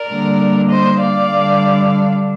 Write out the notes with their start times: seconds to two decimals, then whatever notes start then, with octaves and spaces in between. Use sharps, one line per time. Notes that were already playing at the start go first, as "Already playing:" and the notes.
Already playing: A#4 D5
0.09 D3 G3 A#3 D4
0.70 C5 D#5
1.00 D5 F5
1.31 D3 G3 D4